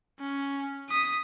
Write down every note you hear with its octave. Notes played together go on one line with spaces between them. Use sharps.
C#4
D#6 B6